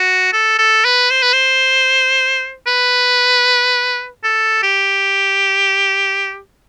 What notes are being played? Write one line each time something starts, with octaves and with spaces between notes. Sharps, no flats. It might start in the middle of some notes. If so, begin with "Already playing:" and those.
Already playing: F#4
A4
A4
B4
C5
B4
C5
B4
A4
G4